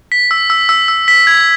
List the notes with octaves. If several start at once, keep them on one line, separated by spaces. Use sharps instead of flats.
B6
E6
E6
E6
E6
B6
G#6